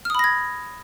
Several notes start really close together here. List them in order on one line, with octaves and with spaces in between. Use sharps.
F6 D#6 B5 A#6 G#6